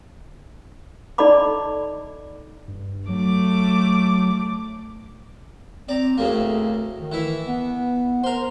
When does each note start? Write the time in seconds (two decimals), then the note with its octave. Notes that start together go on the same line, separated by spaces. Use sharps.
1.18 D#4 A4 D5 D#5 B5 D6
2.68 G2
3.09 F#3 A3 D6
5.89 C4 D5 A#5
6.18 D2 A2 C#3 A#3
7.00 D#3
7.12 E3 E4
7.47 B3
8.24 A#4 C5 C6